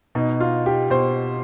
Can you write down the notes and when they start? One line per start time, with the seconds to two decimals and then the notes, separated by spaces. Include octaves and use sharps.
0.15 B2 D#4
0.40 F4
0.66 G4
0.90 B2 C5